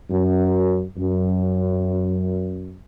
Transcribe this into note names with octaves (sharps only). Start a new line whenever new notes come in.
F#2
F#2